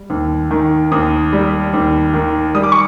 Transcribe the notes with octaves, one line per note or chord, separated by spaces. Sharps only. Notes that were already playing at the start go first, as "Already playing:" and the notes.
Already playing: G3
D#2
D#3
D#2 D#6
G3
D#2
D#3
G3 D#6
D6
C#6